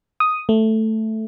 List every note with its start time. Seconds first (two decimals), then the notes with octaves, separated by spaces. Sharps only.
0.20 D#6
0.49 A3